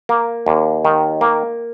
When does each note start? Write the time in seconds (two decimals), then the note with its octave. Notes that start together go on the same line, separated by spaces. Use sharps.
0.09 A#3
0.46 D#2
0.85 D#3
1.21 A#3